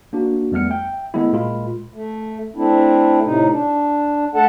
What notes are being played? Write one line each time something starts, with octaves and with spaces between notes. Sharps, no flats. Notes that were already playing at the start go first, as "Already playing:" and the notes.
A#3 D4 F#4
F2 G3 A3 B3 F6 C#7
E5 G5
D#3 G#3 A3 B3 E4
A#2 G#3 F4 B5
A3
A3 C4 D4 E4
A2 C3 D#4
D4
A3 A4 F#5 A5